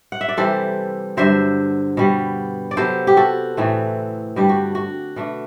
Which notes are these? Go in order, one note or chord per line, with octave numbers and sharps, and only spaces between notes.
F#5
E5
D5
C3 E3 G3 A4 C5
G2 D3 F#3 C5 E5
B2 G3 B3
D5
C3 F#3 B3 A4 C5
G4
F#4 A4
A2 E3 A3 C4
G2 D3 G3 D4 G4
F#4
F#4
B2 A3 D4